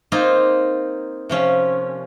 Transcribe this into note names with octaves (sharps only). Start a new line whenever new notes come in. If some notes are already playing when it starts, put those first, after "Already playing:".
A#3 C4 D#4 F4
C3 F3 C#4